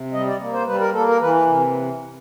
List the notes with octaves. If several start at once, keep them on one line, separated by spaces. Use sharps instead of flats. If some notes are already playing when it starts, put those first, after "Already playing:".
Already playing: C3
G3 D#5
D5
A#3
C5
G3 B4
A#4
A#3 A4
A#4
E3 B4
B4
C3